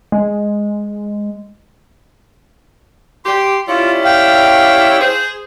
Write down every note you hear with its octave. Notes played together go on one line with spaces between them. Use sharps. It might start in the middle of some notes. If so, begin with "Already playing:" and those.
G#3
G4 C6
G3 C#4 E4 F4
F5 G5
G#4 C5